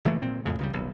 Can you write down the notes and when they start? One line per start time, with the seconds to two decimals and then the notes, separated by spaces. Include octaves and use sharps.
0.05 F#1 E3 A3 A#3
0.22 A#2 C4
0.45 F2 A2 C#3
0.59 C#2 C#3 G3
0.73 D#1 B1